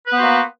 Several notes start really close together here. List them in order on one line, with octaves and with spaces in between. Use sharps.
B4 B3 C5 F#4 A#3